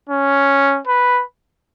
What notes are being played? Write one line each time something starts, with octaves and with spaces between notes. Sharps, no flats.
C#4
B4